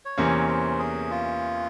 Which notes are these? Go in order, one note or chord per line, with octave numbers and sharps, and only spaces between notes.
C#5
E2 C3 E3 A#3 C#4 C5
C5
G#4
F4